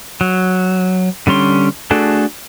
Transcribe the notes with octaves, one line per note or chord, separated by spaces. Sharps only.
F#3
D3 G3 C#4 C6
A3 D4 F#4 G#4 A4